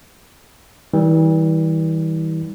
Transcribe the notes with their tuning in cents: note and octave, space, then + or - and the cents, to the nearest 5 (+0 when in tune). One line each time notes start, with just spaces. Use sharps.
E3 -40 G3 -10